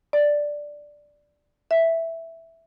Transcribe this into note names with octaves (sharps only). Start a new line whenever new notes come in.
D5
E5